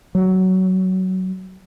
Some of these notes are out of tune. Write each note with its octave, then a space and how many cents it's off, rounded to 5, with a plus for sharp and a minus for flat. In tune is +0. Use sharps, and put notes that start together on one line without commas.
F#3 +15